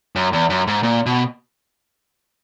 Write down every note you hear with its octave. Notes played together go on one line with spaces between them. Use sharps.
F#2
E2
F#2
G#2
A#2
B2